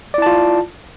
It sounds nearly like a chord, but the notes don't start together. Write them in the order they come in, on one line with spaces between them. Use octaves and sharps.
D5 E4 A5 F4